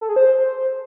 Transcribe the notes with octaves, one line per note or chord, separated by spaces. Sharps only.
A4
G#4
C5